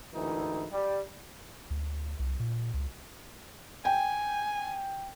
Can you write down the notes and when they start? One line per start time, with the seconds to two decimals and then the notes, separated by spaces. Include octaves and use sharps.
0.13 D2 G#2 E3 D#4 E4 A#4
0.71 G3
1.70 D2
2.19 C2
2.40 A#2
2.74 C#2
3.85 G5 G#5